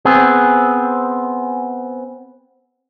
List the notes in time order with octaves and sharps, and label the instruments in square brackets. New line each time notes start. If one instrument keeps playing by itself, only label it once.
[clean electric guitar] B3 C4 G#4